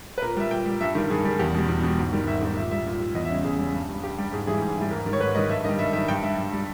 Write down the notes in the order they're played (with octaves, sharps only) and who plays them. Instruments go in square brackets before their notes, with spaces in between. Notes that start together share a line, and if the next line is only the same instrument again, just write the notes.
[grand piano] B4
A#2 A#4
G3 E5
A#2 G5
G3
G2 E5
D#3 G3
G2 G#4
D#3 G3
E2 G4
B2 G3
E2
B2 G3
G#2
D#3 G3
G#2 E5
D#3 G3
A#2 E5
G3 E5
A#2
G3
E2 D#5
E5
C#3 G3
E2 G#4
C#3 G3
G2
G3
G2 G4
G3
G#2 G#4
E3 G3 G#4
G#2
E3 G3
G#2 A#4
D#3 G3
C#5
G#2 B4
D#3 G3 D#5
G2 E5
D#3 D#5
G3
G2 E5
D#3 E5
G3
G2 G5
G3 E5
G2
G3